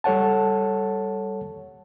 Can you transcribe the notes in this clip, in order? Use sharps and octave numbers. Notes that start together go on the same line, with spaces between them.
G3 A4 C#5 F#5 A5